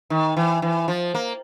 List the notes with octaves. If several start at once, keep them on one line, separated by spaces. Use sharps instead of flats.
D#3
E3
E3
F3
A#3